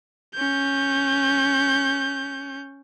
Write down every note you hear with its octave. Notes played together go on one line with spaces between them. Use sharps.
C#4 G6